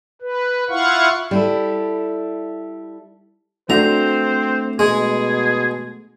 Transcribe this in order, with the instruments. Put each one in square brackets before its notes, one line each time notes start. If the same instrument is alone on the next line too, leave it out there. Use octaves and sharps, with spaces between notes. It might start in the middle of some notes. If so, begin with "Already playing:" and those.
[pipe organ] B4
E4 F4 F5 F#5 C#6
[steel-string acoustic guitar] G3 E4 A4
[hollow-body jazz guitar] A3 D4 F#4 [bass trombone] C4 [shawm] C5 [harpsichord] A#5
[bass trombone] B2 [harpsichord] G#3 [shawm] G#4